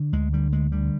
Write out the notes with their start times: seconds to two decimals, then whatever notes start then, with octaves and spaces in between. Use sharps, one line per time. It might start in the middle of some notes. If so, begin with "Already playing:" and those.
Already playing: D3
0.13 D2 G#3
0.33 D3 G3
0.52 D2 G#3
0.72 D3 G3